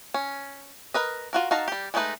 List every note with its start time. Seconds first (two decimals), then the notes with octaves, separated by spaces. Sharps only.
0.14 C#4
0.94 A#4 B4 D#5
1.33 F4 F#4 A#4
1.51 D#4 F#4 F5 A5 A#5
1.68 G3 G4
1.94 G#3 A3 D4 D#4 B4